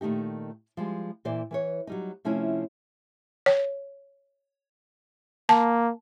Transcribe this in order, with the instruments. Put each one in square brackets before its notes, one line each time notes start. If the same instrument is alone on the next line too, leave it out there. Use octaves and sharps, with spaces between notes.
[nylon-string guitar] A#2 D#3 A3 D#4 G4
F3 G3 G#3
A#2 E3 C5 D5
E3 B4 C#5
F#3 G3 D#4
C3 F3 A3 C#4 E4
[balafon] C#5
[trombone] A#3 [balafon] A5